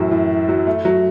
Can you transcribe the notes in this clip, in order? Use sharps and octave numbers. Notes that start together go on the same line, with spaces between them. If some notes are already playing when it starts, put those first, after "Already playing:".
Already playing: F#2 A2 E3 F#3
A2
F#3
A3
F#3